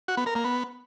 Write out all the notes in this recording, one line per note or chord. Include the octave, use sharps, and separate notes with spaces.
F#4
B3
A#4
A#3
B3